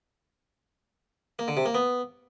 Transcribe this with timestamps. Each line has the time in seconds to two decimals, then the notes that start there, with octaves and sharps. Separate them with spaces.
1.39 A#3
1.48 D3
1.57 C3
1.66 A#3
1.75 B3